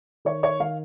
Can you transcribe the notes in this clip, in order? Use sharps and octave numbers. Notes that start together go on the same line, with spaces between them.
D#3 C#5
C#5
D#3 F5